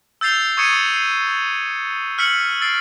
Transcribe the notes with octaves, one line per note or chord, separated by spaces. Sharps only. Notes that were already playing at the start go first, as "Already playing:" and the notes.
E6 G6 A6 C7 F7 G7
C#6 D#6 G#6 C#7 D#7 E7
C7
E6 F6 B6 C#7 F#7
E6 A6 C7 D7